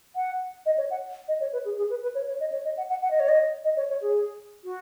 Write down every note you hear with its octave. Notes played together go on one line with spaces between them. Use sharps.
F#5
D#5
C#5
F#5
D#5
C#5
B4
G#4
G#4
B4
B4
C#5
C#5
D#5
C#5
D#5
F#5
F#5
F#5
D#5
C#5
D#5
D#5
C#5
C#5
G#4
F#4